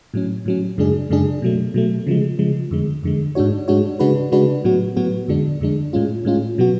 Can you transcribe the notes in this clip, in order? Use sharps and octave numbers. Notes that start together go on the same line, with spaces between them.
A2 F#3 C#4
A2 F#3 C#4
F#2 C#3 G#3 D4 G#4
F#2 C#3 G#3 D4 G#4
B2 F#3 A3
B2 F#3 A3
C#3 F3 G#3
C#3 F3 G#3
F2 D3 G#3
F2 D3 G#3
G#2 G#3 D4 F#4 C#5
G#2 G#3 D4 F#4 C#5
C#3 G#3 D4 F#4 B4
C#3 G#3 D4 F#4 B4
A2 F#3 B3 F#4
A2 F#3 B3 F#4
F2 D3 G#3 D4
F2 D3 G#3 D4
A2 G#3 C#4 F4
A2 G#3 C#4 F4
B2 F#3 B3 F#4